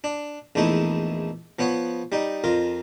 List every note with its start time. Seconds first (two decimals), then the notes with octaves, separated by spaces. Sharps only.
0.04 D4
0.55 A#1 E2 A3 D#4 E4
1.59 F3 B3 C#5 F#5
2.12 G3 D#4
2.44 F2 F4 A#4